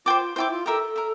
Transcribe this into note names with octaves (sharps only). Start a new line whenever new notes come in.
F4 C5 G5 D6
E4 C5 G5 D6
F4
G4 A4 A#4 E5
A#4 E5